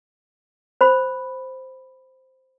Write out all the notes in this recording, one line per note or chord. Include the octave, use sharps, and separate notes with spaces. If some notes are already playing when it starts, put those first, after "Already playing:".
C5 B5